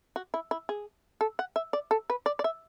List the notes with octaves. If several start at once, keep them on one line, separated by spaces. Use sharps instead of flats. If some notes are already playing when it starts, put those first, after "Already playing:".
F#4
E4
E4
G#4
A4
F#5
E5
D5
A4
B4
D5
D5
E5